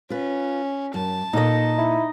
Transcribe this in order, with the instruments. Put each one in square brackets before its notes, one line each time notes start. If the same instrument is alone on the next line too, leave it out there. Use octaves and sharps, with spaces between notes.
[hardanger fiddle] C#4 [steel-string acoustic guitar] F4 B4
[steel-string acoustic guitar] F#2 [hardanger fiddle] A5
[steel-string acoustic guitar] A#2 A4 [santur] D#4 D#5
[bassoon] E4